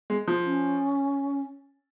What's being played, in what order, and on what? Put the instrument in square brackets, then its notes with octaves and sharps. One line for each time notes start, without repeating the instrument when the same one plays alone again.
[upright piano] G#3
F3
[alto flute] C#4